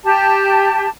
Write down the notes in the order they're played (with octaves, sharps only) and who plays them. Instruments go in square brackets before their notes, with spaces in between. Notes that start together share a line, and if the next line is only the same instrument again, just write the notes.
[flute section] G4 A5